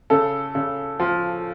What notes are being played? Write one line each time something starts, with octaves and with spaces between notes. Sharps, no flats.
C#3 A4
C#3
F3